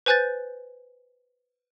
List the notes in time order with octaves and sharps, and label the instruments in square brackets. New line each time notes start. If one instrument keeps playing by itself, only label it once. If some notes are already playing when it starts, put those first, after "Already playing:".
[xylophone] B4 C5 G#5 F#6 G6 A6